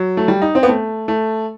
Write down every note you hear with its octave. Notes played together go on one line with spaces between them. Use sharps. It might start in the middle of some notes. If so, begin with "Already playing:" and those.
Already playing: F#3
A3
G3
D#4
C4
B3
A3
A3